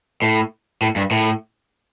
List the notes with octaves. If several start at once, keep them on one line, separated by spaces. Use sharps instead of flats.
A2
A2
G2
A2